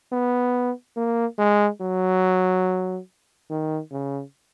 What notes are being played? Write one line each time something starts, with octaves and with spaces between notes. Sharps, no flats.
B3
A#3
G#3
F#3
D#3
C#3